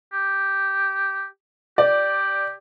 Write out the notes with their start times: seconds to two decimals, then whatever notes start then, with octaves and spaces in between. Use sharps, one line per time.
0.13 G4
1.78 G4 D5